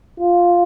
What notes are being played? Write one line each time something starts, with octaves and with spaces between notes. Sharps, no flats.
F4